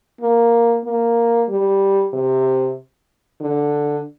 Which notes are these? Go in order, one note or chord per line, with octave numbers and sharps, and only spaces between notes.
A#3
A#3
G3
C3
D3